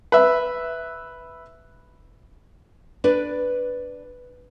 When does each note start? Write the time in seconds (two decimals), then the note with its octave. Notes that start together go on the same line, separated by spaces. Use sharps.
0.12 B4 E5
3.04 D4 B4 D5